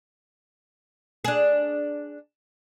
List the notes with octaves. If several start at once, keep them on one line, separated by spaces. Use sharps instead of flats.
D4 G#4